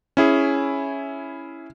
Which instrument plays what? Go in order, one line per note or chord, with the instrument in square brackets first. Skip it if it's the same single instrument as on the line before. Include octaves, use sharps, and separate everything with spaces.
[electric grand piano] C#4 E4 G#4